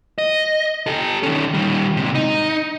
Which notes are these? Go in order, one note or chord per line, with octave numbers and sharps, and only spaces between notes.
D#5
G4 A4
D#3 C#4
D#3 G3
G#2 C3
D#4